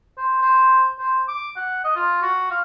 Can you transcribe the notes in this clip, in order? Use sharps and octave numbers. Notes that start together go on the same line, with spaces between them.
C5
C5
C5
D6
F#5
D#5
F4
F#4
F5